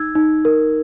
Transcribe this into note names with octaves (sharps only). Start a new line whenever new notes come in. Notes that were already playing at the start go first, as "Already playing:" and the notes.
Already playing: D#4 E6 G#6
D#4
A#4